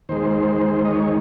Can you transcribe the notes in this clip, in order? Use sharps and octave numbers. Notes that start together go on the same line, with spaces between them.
D#2 D#3 G#3 C5
D#5
C#5